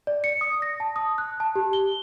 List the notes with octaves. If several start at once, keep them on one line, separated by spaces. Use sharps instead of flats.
D5
C#7
D#6
A#6
A5
D#6
F#6
A5
G4
G7